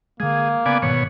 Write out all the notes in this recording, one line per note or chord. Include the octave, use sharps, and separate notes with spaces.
D3 G#3 A#3 G#4
C#3 B3 D5 G#5
G1 G#2 B2 D#3 C#5